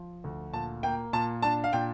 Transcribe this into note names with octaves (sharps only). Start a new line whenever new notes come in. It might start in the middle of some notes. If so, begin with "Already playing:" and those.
Already playing: F3
D2
A#2 A5
A#3 G5
A#2 A5
D4 A5
F5
A#2 G5